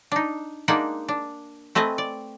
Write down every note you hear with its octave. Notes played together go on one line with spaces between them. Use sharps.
D4 D#4
G#3 A#3 D4 D#4 G#4 F#5
D4
A3 C4 B4 D#5 G#5
D5